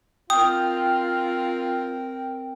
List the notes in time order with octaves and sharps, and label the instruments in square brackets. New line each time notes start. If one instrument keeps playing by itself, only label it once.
[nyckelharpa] C4 A#4 [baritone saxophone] F4 [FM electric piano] G5 [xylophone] D#6